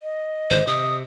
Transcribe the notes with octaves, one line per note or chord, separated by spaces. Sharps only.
D#5
G#1 D3 C5
C3 D#6